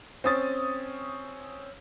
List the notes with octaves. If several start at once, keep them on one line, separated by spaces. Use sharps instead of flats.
C4 C#4 D#6 A6